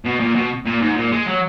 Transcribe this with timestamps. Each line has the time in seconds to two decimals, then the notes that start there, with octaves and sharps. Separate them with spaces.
0.05 B2
0.20 A#2
0.35 B2
0.66 A#2
0.81 G#2
0.96 A#2
1.12 G#3
1.26 F#3